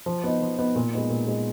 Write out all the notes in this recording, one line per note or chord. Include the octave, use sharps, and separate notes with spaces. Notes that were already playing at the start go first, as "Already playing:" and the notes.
F3
B3 D#4
F3
B3 D#4
A#2
G#3 B3 D#4
A#2
G#3 B3 D#4